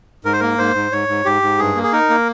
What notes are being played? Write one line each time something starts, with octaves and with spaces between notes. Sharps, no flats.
G#2 A#4
C5
A#3 A#4
G#2 C5
G#2
G#2 C#5
G#2
G#2 G4
G#2
G2 G#4
A#3
G#4
D#4 A#4
A#3